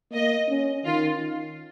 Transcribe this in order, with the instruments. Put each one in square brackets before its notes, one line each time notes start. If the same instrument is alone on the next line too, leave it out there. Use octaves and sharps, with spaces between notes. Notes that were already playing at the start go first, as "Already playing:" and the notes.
[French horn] A#3 [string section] D#5
[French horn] C#4
[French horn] D#3 [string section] F4